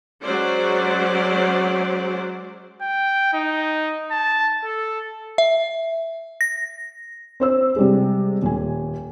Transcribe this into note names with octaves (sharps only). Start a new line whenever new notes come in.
F#3 G#3 C#4 C5 D5
G5
D#4
A5
A4
E5
A#6
C4 C5 E6
C3 G3 G#3
D#1 G#5